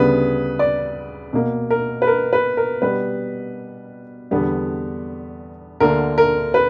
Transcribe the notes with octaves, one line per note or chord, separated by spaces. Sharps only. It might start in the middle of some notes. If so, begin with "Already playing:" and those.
Already playing: D2 C#3 G3 B3 B4
D5
B2 A#3
A#4
B4
A#4
B4
A#4
B2 G3 B3 B4
E2 D3 G3 B3
D2 D3 A#3 A#4
A#4
B4